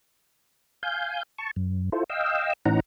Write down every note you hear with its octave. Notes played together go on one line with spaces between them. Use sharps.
F5 G#5 G6
A5 C#6
F#2
E4 F4 A4 C5
D#5 F5 G5 E6
A2 E3 C#4 D#4 F#5 A#5